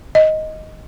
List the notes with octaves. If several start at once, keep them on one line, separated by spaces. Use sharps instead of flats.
D#5